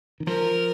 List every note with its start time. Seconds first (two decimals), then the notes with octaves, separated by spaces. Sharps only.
0.20 D#3
0.27 F3 A#4